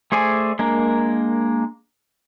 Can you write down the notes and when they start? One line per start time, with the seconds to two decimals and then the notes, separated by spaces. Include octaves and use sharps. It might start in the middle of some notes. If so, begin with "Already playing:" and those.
0.12 A3 G#4 C5 D5 G#5
0.59 G#3 A#3 D4 A#4